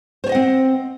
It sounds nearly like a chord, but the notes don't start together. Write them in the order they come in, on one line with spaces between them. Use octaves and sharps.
C5 C#5 D#5 F#5 C4